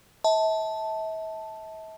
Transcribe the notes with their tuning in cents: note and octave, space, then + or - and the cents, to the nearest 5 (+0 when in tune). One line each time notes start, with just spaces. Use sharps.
E5 -40 A5 +0